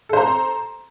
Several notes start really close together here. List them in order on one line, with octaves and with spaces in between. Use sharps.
A4 C5 A#5